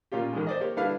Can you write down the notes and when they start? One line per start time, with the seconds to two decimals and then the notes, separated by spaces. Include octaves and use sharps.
0.12 A#2 C#4 F4 G4
0.33 A1 D#3 G#3
0.47 C5 D5 D#5
0.60 A#3 G4 C#5
0.76 D3 G3 D4 E4 B4 F5